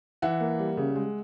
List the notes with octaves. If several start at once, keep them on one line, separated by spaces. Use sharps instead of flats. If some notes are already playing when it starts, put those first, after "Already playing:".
E3 E5 F#5
A#3
G3
C#3
G#3